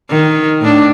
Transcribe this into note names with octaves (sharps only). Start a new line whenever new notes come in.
D#3
A2 D4